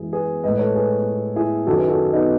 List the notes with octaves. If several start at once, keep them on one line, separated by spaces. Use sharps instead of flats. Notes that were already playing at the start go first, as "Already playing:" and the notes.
Already playing: F#2 E3 G#3 E4 G#4
G#4 B4
A2 G#3 B4 D#5
B4
A4 C#5
G#4 B4
E4 G#4
F#2 D#3 F#3 F#4 A4
G#4 B4
F#4 A4
B3 D#4